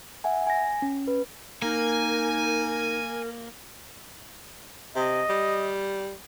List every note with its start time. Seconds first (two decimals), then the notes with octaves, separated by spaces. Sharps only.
0.24 E5 F#5 G#5
0.47 G#5 A#6
0.82 C#4
1.08 B4
1.62 A#3 D#4 A#4 G#5
4.96 C3 D#5
5.30 G3